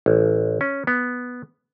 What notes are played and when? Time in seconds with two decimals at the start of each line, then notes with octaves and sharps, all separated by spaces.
0.06 A1
0.61 C#4
0.87 B3